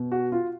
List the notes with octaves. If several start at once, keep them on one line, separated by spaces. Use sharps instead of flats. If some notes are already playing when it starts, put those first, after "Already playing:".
Already playing: B2
F#4
F4